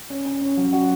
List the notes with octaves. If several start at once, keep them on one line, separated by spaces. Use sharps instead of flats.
C#4
C#4
C#4
F#3
F#4